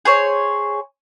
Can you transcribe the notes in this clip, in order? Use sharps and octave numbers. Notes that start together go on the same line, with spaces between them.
G#4 C5 C#5